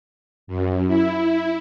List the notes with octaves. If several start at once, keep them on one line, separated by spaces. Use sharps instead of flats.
F#2
E4